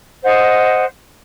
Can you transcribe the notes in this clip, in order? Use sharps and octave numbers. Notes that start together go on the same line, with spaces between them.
C5 D#5 F#5